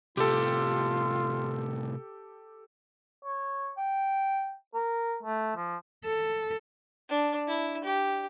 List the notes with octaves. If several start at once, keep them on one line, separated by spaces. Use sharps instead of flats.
A2 C3 F4 G4 A4
C#5
G5
A#4
A3
F3
A4
D4
E4
G4